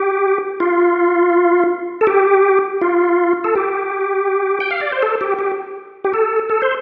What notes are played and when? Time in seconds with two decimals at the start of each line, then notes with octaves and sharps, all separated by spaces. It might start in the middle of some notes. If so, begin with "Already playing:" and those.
Already playing: G4
0.60 F4
2.01 A4
2.07 G4
2.82 F4
3.44 A4
3.56 G4
4.60 G5
4.71 F5
4.80 D5
4.92 C5
5.02 A4
5.21 G4
5.39 G4
6.04 G4
6.14 A4
6.50 A4
6.62 C5